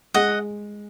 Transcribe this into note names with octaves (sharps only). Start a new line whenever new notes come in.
G#3 D#5 F#5